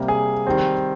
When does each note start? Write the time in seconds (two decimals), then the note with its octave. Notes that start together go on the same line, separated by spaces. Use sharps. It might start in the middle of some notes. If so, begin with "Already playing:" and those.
Already playing: C3 G3 A#3
0.08 G#4
0.47 D#3 G3 C4